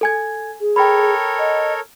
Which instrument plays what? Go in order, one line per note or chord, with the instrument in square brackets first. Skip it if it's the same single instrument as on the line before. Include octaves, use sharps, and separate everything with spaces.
[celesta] A4 G#5 G#6
[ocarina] G#4
[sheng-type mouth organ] A4 A#4 C#5 [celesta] G5 B5
[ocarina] D#5